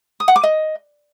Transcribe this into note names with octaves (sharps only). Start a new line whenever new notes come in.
D#6
F#5
D6
D#5